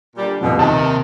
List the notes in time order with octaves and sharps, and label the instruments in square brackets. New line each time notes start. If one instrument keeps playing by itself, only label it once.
[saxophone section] A#2 D3 G3
[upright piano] D#1 F2 [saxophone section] B2
[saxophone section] D#2 D#3 [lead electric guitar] C3 [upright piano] A5